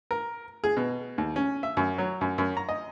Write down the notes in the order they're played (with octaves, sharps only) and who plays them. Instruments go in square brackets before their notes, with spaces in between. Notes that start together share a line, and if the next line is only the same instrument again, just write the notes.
[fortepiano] A#4
G#4
B2
D#2
C#4
E5
F#2
F#3
F#2
F#2
A#5
D#5